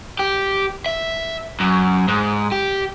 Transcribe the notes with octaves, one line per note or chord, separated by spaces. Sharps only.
G4
E5
F#2
G#2
G4